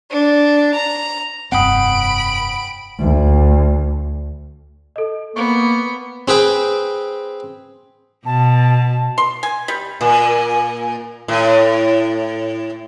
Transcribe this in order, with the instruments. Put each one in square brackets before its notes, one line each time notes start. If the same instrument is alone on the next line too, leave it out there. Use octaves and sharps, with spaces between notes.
[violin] D4
A#5
[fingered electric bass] F1 G2 C4 [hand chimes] F#5 G5 D#6 [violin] B5 D7
[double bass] D2
[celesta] A4 D#5
[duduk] A#3 [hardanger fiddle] B3 [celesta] C#6
[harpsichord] C4 G#4 B4 G5
[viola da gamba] B2 [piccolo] A5
[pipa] C6
G#5
G3
[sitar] A#2
A2